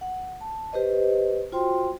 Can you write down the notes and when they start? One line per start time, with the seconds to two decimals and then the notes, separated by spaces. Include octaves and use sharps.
0.01 F#5
0.41 A5
0.73 G4 B4 C5 D#5
1.52 F4 F#4 C5 G5 C6